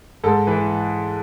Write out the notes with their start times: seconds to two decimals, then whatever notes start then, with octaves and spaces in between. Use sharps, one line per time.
0.24 G#2 A4
0.47 E3 B4